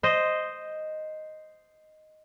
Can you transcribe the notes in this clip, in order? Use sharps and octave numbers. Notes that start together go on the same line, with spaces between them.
C5 D#5